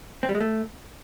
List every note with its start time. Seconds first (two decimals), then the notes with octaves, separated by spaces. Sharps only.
0.23 C4
0.29 G3
0.35 G#3
0.40 A3